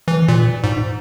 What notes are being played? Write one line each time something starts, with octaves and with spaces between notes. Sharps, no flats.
E3
A#2
G#2